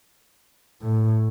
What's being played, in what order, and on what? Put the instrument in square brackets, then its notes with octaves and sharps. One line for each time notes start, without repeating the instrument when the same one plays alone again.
[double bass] A2